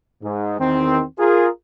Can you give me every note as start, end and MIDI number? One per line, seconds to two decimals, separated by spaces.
0.23 0.56 44
0.60 1.03 40
0.60 1.03 51
0.60 1.03 60
1.19 1.49 65
1.19 1.49 68
1.19 1.49 70